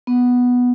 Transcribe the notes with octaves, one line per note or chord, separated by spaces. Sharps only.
B3